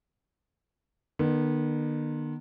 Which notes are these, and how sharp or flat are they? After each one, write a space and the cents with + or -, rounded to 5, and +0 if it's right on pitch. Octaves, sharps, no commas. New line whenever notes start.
D#3 -45 B3 -30